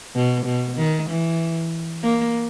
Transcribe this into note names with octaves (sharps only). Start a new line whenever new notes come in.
B2
B2
D#3
E3
A#3